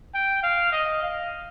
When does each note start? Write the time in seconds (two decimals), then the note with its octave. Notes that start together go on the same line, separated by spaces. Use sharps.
0.15 G5
0.43 F5
0.72 D#5
1.02 F5